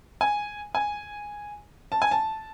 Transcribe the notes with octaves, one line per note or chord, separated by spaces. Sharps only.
G#5
G#5
A5
G#5
A5